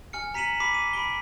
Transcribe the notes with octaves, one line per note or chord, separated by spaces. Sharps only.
G#5 F6 C#7
A#5 B6 C#7 D#7 E7 F#7
B5 D6 B6
D#7
B5 B6 D7 G7